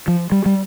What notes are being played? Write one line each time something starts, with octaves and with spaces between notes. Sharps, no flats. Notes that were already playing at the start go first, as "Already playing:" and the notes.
F3
G3
G3